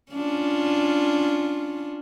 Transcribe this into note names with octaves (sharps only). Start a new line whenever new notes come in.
C#4 D4 F4